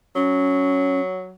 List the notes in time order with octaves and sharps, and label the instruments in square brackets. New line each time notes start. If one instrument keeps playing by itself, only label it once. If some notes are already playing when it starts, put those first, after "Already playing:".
[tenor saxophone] F#3 [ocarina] C#4